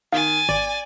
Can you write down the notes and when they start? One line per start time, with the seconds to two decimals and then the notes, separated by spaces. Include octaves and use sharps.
0.12 D#3 F5 G#5 A6
0.49 G#1 D5